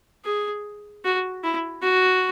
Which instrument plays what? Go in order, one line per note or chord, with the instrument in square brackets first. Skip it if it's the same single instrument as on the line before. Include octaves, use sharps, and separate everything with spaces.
[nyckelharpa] G#4
F#4
E4
F#4